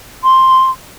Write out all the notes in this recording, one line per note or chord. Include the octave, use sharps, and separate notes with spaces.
C6